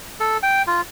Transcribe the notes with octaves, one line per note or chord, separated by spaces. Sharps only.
A4
G5
F4